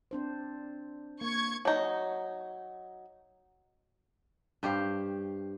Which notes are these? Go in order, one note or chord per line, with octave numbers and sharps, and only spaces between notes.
C4 D4 C5
A#3 C#6 G#6
F#3 D#4
G2 G4 C5 F5